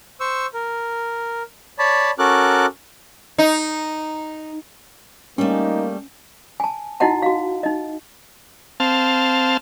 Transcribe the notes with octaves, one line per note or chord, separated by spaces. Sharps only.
C5 C#6 E6
A#4
C#5 D5 A5 B5
C#4 F#4 A4 A#4 D6 F#6
D#4
G3 A3 A#3 C#4 D#4
G#5 A5
D#4 E4 F#4 D#5 F#5 A5
F#4 F5
D#4 D#5
C4 F5 A5